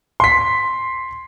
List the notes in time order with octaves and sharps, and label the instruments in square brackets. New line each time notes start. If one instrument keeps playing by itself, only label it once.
[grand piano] C6 B6